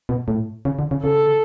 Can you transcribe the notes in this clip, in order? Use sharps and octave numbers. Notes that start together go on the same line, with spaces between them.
B2
A2
C#3
D3
C#3
C#3 A4